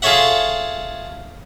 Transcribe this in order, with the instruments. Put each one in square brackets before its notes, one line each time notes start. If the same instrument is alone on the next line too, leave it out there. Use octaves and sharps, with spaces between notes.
[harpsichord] F4 G#4 A4 C#5 E5 F#5